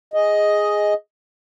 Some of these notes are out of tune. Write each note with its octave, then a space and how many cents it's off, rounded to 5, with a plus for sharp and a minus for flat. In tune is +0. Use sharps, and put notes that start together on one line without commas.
G#4 +0 D#5 +5